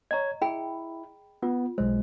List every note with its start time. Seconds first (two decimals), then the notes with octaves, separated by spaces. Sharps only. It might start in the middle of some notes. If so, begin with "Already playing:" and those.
0.11 C#5 D#5 A#5 G#6
0.42 E4 G#4 G5 B5
1.42 B3 F4
1.78 B1 G#3 C5